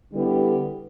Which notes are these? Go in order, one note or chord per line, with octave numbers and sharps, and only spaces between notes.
D3 G3 B3 E4 G4